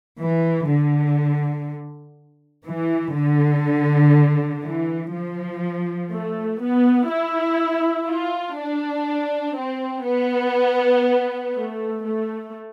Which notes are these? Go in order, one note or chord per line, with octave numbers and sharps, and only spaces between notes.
E3
D3
E3
D3
E3
F3
A3
B3
E4
F4
D4
C4
B3
A3
A3